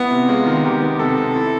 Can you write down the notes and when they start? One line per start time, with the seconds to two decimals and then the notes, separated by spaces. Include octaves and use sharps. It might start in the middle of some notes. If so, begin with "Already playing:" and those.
Already playing: B3 E4
0.11 C3
0.28 G#3 F4
0.46 D#3
0.64 D#3 G4
0.82 B3
0.99 C3 A4
1.18 C3
1.36 E4